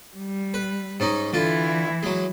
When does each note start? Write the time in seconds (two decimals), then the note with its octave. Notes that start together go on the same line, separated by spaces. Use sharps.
0.15 G3
0.54 B4
1.00 G#2 C#4 D#4
1.33 D3 E3 E4 F4
2.03 F#3 G#3